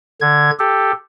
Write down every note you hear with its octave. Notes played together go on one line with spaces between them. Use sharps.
D3 G#6
G4 A4